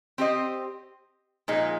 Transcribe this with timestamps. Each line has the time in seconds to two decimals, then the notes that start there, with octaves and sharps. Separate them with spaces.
0.18 C4 G4 C5 D#5
1.48 A#2 F3 G#3 D#4